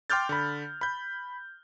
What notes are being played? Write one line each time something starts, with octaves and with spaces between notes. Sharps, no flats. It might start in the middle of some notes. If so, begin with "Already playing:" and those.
G5 C6 D6 F6 G6 A6
D3 B5
B5 G6